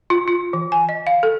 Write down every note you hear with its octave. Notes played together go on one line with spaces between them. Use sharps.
F4
F4
E3
G#5
D#5
F5
A4